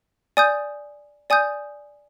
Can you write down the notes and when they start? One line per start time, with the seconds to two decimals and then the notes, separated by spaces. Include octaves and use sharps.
0.37 D5 G#5 D#6 G6
1.30 D5 G#5 D#6 G6